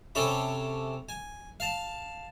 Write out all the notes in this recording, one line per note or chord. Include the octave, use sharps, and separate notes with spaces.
C3 C#4 A4 E5 B5
G#5
F5 A5